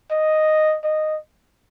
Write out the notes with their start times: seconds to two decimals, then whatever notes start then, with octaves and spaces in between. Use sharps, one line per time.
0.11 D#5
0.84 D#5